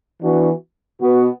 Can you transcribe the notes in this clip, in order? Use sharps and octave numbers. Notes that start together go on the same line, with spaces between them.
E3 B3 D4 F#4
B2 B3 F#4